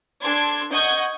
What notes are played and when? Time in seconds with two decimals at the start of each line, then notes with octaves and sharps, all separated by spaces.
0.22 D4 A4 C6 G#6
0.72 D#5 F#5 C#6 G6 G#6